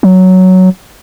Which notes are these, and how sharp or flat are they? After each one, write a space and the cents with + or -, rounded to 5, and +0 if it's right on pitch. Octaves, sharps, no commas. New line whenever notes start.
F#3 +5